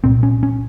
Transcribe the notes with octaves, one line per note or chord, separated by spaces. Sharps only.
C2 A#2 C4
C#4
C#4